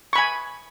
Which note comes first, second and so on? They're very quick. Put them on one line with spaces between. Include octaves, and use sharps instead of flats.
C#6 B5 G#5